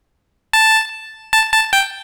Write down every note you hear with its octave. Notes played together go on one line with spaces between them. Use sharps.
A5
A5
A5
G5